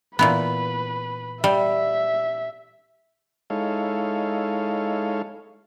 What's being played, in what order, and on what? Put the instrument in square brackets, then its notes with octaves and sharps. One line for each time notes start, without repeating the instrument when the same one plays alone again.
[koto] A#2 E3 B3 [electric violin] B4
[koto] G3 [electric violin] E5
[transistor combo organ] G#3 D#4 E4 A4 C#5 F5